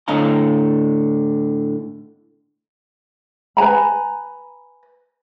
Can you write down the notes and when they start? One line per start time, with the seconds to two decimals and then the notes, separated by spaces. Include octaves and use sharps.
0.08 A2 D3 D#5 F5 A#5
3.57 B4 G#5 A#5 B5